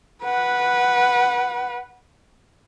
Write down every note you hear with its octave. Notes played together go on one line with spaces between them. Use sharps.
B4 F#5